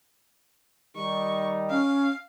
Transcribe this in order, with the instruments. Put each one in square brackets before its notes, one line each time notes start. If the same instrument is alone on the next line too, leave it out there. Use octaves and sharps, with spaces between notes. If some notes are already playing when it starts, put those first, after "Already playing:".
[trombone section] D#3 G3 D#4 [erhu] C#6
[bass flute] C#4 [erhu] F5